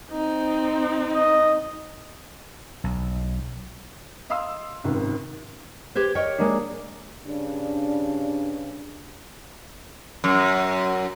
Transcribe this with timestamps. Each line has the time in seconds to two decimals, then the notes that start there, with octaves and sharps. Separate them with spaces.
0.11 C4 D#4
1.13 D#5
2.84 B1
4.30 D#5 F5 C6 D#6 E6
4.84 G#1 C#2 C3 D#3
5.95 G4 B4 C5 G#6
6.15 A#4 C#5 D#5 G5
6.38 G#3 A#3 D4
7.26 G2 C#3 D4
10.24 F#2